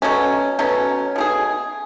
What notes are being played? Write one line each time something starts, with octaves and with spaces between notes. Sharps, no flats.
B2 F#3 A3 C#4
B2 F#3 A3 C#4
B2 A3 E4 G#4